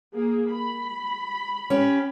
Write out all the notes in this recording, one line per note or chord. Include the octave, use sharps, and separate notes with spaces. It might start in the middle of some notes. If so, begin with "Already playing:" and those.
A#3 G#4
B5
C#4 G4